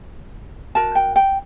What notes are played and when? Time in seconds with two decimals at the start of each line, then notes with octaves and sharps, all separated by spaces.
0.75 F#4 A#4 A5
0.95 G5
1.16 G5